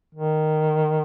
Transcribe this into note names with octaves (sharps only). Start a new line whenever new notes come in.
D#3